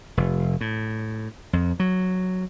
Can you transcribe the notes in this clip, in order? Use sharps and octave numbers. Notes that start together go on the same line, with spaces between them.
F1
A2
F2
F#3